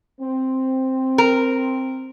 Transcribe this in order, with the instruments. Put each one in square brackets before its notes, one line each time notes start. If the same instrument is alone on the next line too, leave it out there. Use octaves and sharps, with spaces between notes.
[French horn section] C4
[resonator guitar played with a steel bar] A#4